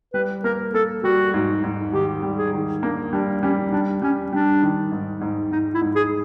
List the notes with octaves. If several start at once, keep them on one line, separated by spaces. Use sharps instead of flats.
G3 B4
A#3 A#4
A#3 A4
G3 F#4
G#2
G#2
D#3 G4
G3
G#4
D#3
A#3 D4
G3 D4
G3 C#4
G3 D4
G3 C#4
G3 D4
D#3
G#2
G#2
G#2 D#4
E4
G#2
G#4